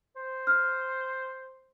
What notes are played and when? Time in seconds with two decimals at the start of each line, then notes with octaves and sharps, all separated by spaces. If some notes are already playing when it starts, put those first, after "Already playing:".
0.16 C5
0.47 F6